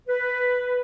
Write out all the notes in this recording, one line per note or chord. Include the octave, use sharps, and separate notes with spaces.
B4